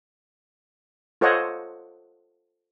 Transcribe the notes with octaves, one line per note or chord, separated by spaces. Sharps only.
F4 A4 C5 C#5 D#5 F#5